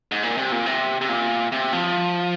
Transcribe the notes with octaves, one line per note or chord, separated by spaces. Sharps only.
G#2
A#2
C3
A#2
C3
C3
A#2
C3
F3